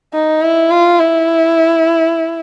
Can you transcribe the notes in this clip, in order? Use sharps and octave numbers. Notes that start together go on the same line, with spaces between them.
D#4
E4
F4
E4